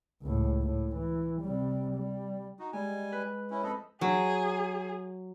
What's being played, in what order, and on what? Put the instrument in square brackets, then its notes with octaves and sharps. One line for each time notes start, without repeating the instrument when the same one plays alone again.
[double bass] C#2 A2
A2
E3
C3 G3
G3
[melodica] D#4 F#4
[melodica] G3 G#5 [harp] G#3
[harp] B4
[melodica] C#4 E4
[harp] F2 B5 [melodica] A4 D#5
[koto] F#3 [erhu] G#4